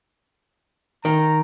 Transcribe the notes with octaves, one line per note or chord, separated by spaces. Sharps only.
D#3 A#5